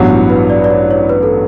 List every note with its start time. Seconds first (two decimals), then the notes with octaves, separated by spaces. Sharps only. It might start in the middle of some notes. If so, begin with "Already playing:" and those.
Already playing: A1 G2 F#3 B3 F#4
0.10 E4
0.30 B4
0.50 D5
0.64 D5
0.70 C#5
0.91 C#5
1.09 B4
1.23 A4